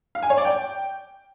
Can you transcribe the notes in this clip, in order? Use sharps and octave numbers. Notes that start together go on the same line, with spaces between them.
F5
G#5
C#5
D5
G5